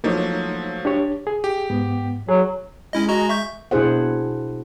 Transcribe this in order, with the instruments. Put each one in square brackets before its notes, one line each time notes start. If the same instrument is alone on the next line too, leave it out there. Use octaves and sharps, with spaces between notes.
[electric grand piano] F3 F#3 A3 [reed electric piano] A#3 D#4 C#5
[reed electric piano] D4 G4 C#5
G#4
[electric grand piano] G4
[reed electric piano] G#2 B3
[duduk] F#3 [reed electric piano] G#4
[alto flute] G#3 [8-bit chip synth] C#4 E4 D#5
[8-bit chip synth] F#4 D#5 A#5
E5 C#6 G6
[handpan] B2 D4 E4 G#4 C5 F#5